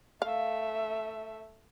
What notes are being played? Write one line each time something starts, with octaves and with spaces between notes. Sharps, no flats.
A3 E5 F5